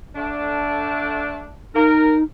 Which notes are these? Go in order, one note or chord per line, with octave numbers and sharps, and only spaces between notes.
D3 A3 D4
D#4 A#4